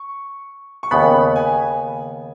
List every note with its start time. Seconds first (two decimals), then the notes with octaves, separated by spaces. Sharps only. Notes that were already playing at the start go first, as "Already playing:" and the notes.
Already playing: C#6
0.83 C#6
0.91 D#2 C#3 B3 B5
1.36 G#5